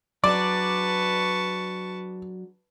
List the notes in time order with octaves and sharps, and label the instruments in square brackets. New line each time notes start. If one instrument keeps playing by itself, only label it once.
[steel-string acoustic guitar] F#3 D4 G#4 [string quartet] B4 A5 C#6 [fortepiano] D5